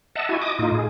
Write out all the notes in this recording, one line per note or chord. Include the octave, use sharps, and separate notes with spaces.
D#5 E5 F#5 A5
E4 F#4 G#5
D#5 D6 D#6
A2 D#4 F4
G#4